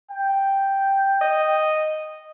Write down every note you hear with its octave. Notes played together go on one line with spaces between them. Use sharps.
G5
D#5